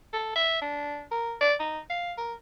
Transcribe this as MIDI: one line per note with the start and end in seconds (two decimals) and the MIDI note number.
0.13 0.34 69
0.36 0.60 76
0.62 1.03 62
1.11 1.34 70
1.41 1.54 74
1.60 1.79 63
1.90 2.13 77
2.18 2.33 70